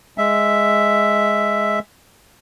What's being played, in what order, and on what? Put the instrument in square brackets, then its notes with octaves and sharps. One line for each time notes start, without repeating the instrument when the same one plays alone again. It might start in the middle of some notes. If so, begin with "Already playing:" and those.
[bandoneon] G#3 E5